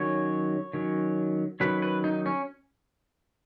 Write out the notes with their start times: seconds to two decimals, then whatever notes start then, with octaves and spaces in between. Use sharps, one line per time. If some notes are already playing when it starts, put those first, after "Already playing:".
Already playing: D#3 F#3 C#4 C#5
0.73 D#3 F#3 C#4
1.60 D#3 F#3 C#4 B4
1.82 B4
2.04 D#4
2.26 C#4